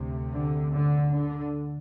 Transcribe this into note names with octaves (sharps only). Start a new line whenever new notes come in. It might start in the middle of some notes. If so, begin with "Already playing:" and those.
Already playing: D2 C3
D3
D3
D3